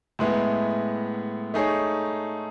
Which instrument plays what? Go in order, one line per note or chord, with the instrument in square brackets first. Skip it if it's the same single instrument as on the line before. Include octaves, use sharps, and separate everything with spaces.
[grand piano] A2 G#3 B3 E4
A3 D#4 G#4 C#5